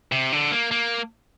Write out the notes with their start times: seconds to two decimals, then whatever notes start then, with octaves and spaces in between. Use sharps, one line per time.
0.12 C3
0.32 D3
0.51 A#3
0.71 A#3